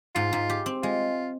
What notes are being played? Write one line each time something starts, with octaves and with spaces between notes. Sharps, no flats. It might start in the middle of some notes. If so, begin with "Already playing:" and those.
G#2 F4
G#2
G4
C4
G#3 F4